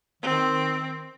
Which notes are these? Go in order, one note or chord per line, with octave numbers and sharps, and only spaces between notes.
D#3 C4